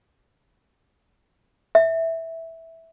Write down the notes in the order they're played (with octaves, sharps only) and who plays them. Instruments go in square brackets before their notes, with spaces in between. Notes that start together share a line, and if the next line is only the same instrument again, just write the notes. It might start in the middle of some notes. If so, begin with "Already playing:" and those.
[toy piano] E5